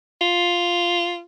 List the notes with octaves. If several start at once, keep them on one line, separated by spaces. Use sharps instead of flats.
F4